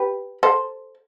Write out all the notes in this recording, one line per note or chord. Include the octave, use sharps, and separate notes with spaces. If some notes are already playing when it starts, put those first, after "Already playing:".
Already playing: G4 B4
A4 C5